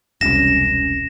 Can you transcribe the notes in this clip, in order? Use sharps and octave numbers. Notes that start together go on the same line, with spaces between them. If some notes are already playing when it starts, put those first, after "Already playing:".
E1 C2 C#4 A#6 E7